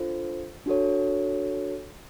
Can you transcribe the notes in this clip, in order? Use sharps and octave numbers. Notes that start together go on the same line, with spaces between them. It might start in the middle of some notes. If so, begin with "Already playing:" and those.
Already playing: D4 F4 A4 C5
D4 F#4 A4 C#5